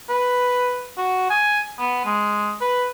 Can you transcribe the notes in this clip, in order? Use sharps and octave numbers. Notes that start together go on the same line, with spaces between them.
B4
F#4
G#5
B3
G#3
B4